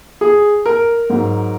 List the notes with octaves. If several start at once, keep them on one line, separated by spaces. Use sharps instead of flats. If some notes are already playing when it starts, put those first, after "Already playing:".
G#4
A#4
G#2 F#3